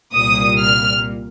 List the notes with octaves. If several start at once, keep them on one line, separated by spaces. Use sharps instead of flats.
C2 A#2 G3 D#6
F6